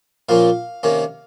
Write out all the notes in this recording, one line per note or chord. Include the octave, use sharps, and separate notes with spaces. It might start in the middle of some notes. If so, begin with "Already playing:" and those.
A#2 F3 A#3 C#4 F5
C3 D#3 A#3 C#4